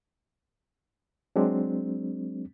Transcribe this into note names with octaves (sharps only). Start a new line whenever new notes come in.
F#3 G#3 C4 D4